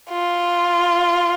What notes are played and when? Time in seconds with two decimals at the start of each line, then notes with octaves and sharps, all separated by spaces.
0.10 F4